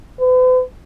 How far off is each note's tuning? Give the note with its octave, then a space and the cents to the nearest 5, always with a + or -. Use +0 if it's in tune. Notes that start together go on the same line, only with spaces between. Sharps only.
B4 +45